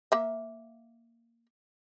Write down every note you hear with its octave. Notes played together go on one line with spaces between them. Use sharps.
A#3 E5